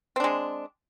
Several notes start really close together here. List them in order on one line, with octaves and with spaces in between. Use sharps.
C4 D4 G#3